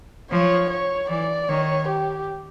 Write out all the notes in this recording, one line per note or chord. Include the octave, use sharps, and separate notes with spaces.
F3 C#5
C#5
E3 D5
D#3 C#5
G4